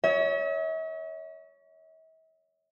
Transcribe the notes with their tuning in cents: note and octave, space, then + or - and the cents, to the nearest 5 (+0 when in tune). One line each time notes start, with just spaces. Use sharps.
C#5 +20 E5 -45